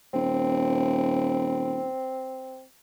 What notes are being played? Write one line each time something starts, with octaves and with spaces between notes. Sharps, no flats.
D#1 C4